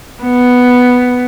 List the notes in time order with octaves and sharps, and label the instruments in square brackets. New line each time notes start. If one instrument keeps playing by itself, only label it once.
[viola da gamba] B3